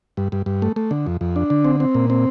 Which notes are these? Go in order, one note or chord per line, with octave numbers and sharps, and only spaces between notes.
G2
G2
G2
A3
A3
D3
F2
F2
D4
D3
C4
C4
A#2
C4